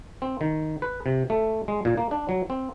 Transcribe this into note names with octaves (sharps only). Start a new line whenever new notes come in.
C4
D#3
B4
C3
A3
G#3
A#2
A#3
D4
F#3
C4